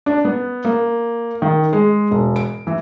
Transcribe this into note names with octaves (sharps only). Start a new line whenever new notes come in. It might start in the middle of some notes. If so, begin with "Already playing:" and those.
D4
B3
A#3
D#3
G#3
E1
D7
E3